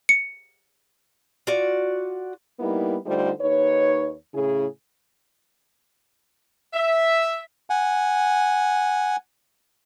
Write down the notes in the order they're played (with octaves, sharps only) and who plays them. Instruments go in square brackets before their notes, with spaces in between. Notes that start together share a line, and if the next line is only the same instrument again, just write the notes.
[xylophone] C#7
[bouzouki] F4 F#4 D5
[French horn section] G3 A#3 B3 D#4 E4
D3 G3 A3 D#4 F4 C5
D#2 D#4 B4 C#5
A2 C#3 E4 G#4
[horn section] E5
[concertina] F#5 G#5